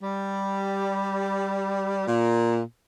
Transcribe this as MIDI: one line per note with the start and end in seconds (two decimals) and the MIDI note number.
0.01 2.07 55
2.07 2.61 46